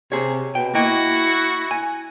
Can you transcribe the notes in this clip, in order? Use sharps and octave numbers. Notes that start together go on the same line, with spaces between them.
C3 G#4 C#5
B2 G5
A#3 E4 F#4 D#5 G5
G#5